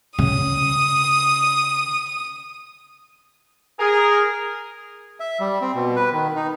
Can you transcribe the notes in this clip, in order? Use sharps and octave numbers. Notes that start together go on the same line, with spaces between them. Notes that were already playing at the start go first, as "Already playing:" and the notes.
C#3 D#6
G#4 A#4
E5
G3
C4
B2
B4
D#3
D#4